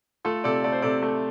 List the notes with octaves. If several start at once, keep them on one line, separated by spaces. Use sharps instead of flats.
A3 F4 A4
C3 A4 D5
A3 D5
C5
C3 A4 D5
A3